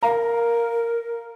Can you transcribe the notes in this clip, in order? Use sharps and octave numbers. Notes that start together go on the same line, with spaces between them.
A#4 F5 A#5